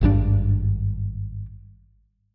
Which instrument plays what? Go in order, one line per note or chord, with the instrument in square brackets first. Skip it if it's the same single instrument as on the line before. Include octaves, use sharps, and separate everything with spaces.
[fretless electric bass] G#1 G2 C3 D4